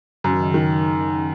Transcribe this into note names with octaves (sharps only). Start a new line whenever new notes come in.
F#2 C#3
D#3
C#3
D#3